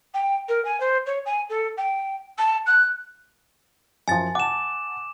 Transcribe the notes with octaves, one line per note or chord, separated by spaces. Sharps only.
G5
A#4
G#5
C5
C#5
G#5
A4
G5
A5
F#6
F#2 F3 G#5 A6
F#5 A5 D6 E7